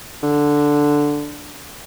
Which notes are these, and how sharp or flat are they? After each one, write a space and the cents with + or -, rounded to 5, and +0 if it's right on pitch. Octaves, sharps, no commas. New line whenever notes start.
D3 +0